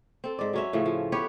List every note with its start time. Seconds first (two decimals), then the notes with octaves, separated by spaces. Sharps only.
0.24 C4 A4
0.39 G#2 D5
0.53 F#3 C#4 E5
0.73 A2 C#3 F3 A3
0.86 F3
1.12 B3 G4 B4 C#5